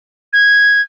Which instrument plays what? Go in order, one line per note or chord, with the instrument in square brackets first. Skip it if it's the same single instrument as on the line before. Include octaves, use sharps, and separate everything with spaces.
[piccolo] G#6